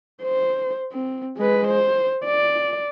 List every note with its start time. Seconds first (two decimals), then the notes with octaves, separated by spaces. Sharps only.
0.22 C5
0.93 C4
1.37 G#3 B4
1.67 C5
2.25 D5